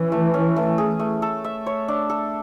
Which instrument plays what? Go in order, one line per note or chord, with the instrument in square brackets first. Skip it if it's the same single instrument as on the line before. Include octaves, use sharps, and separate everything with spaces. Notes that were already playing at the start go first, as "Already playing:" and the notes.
Already playing: [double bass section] E3 [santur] C#4
[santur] A3
C#4
A3
G#4
A3
A4
E5
C#5
D4
A4